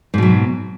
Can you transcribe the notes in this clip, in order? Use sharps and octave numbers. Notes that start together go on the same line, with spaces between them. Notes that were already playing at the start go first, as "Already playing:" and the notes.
G#2 B2 F#3